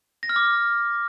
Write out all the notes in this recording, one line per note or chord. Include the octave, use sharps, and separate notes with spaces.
A#6
F6
D6